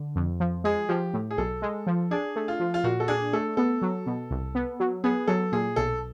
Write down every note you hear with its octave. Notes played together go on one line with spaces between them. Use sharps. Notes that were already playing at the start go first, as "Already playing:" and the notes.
Already playing: D3
F2
F3
G#3 G#4
F3 G4
A2
G#4
B1 A4
G#3
F3
D4 G#4
A3
F4
F3
F4
A#2 F#4
A4
D4 G#4
A3 A4
B3 A4
F#3
B2
C2
B3
F#3
B3 G#4
F#3 A4
A#2 G#4
B1 A4